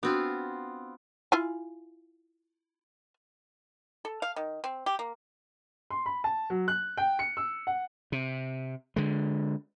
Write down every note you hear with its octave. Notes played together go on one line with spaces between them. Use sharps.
B3 C4 D4 F4 F#4
E4 F4 G#5
A4
F5
D#3
C4
G4
A#3
C6
B5
A5
F#3
F#6
G5
C#7
E6
F#5
C3
D3 G#3